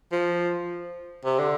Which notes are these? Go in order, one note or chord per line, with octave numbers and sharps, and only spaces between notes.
F3
C3
D3